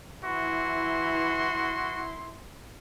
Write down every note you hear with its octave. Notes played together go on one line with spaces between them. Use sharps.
E3 E4 F#4 C6